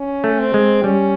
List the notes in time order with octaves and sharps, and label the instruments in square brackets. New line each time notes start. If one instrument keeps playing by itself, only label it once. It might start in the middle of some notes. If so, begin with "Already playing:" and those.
Already playing: [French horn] C#4
[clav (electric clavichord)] A3
[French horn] C4
[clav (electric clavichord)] G#3
[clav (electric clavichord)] G3 [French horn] C#4